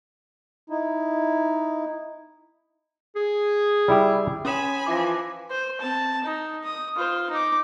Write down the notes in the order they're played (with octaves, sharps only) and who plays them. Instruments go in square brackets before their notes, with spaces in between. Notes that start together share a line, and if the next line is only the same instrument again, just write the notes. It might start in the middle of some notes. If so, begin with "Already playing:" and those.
[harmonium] D#4 E4
[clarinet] G#4
[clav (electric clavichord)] G3 E4 G4
[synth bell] C#4 D#6 E7 [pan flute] C#5 [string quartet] G#5 B5
[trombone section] E3 F3 [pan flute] F4 [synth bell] D6 A#6
[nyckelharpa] C5
C4 A5
D#4
D#6
F4 C5
D#4 D6